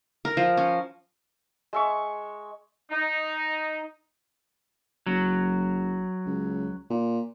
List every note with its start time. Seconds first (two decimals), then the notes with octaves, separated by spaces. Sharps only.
0.25 A#4
0.37 F3
0.57 C#4
1.73 G#3 E5 C#6
2.91 D#4
5.07 F#1 F#3
6.26 C#2
6.90 A#2